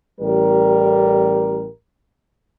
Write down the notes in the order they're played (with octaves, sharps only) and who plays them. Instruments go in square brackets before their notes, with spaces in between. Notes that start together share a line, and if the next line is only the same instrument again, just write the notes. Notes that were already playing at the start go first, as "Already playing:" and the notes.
[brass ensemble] A1 G3 A#4